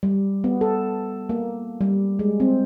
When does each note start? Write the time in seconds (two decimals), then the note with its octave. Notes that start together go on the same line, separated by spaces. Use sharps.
0.03 G3
0.44 B3
0.61 A4
1.29 A#3
1.81 G3
2.19 G#3
2.40 C4